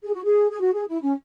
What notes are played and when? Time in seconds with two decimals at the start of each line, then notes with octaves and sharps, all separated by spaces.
0.04 G#4
0.14 F#4
0.24 G#4
0.51 G#4
0.60 F#4
0.74 G#4
0.88 E4
1.02 C#4